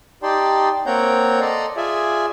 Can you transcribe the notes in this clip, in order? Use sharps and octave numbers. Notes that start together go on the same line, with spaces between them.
D#4 G4 D5 G5 A5 C6
A#3 C4 C#5 F#5 A#5 G6
A4 D5 D#5 A#5 C6
F4 G#4 D5 E5 G#5